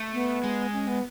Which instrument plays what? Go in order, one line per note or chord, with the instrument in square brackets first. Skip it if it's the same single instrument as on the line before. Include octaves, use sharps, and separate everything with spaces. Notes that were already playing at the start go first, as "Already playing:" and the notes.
Already playing: [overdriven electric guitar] A3
[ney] B3
[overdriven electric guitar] G#3
[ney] C#4
B3